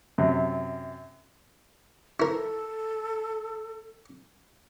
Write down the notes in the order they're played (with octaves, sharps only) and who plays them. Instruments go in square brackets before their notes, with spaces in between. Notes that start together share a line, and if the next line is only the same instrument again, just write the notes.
[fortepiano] F#2 C3
[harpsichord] E4 A#4 [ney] A4